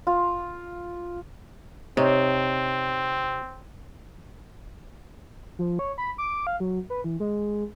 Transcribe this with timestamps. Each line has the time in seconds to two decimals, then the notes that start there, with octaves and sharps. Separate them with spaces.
0.07 F4
1.97 C3 C4 D#4 C#5
5.59 F3
5.79 C#5
5.98 B5
6.18 D6
6.47 F5
6.60 F#3
6.90 B4
7.04 E3
7.20 G#3